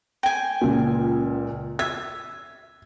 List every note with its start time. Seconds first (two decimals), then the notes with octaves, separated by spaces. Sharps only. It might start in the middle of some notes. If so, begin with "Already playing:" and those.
0.23 G5 G#5
0.61 C#2 A#2
1.79 E5 G#6